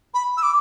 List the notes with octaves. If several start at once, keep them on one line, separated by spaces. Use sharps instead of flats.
B5
E6
D6